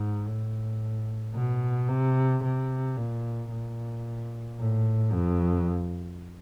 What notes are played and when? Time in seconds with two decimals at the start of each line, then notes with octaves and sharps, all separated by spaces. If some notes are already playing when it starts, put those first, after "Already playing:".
Already playing: G#2
0.27 A2
1.34 B2
1.88 C3
2.43 C3
2.97 A#2
3.51 A#2
4.59 A2
5.12 F2